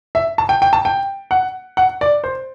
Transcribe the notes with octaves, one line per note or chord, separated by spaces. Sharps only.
E5
A5
G5
G5
A5
G5
F#5
F#5
D5
C5